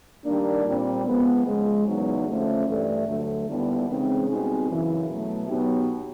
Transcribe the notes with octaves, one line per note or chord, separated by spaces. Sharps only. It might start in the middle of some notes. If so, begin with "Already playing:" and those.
D#3 G3 A#3 D4
A#2 G3 C4
F3 G#3 B3
C#3 F3 G#3
E2 C#3 F#3 B3 D#4
D3 F3 A3 C#4
G2 E3 A3 D4
D2 D3 F#3 A3
D#2 D3 G3 B3 E4
C#3 E3 G#3 C4 D#4
B2 G3 C4 D#4 G#4
F#2 C#3 E3
B2 F#3 A3
B2 F#3 B3 D#4 G4